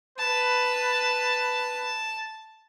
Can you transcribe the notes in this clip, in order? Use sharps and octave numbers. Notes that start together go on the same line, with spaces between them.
B4 A5